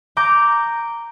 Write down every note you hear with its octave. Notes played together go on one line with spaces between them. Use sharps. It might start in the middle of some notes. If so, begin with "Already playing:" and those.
A#5 D6 G6